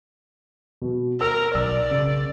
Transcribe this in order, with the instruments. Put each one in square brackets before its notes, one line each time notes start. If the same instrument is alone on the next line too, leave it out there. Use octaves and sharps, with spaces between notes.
[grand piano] B2
[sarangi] A#4 [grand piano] E6
[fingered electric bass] B1 [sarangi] D5 [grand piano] E6
[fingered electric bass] C#3